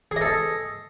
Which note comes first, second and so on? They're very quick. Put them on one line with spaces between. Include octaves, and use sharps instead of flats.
G#4 D#5 A4